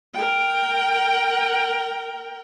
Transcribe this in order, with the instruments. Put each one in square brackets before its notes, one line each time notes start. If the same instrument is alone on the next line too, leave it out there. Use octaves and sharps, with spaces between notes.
[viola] A#4 G5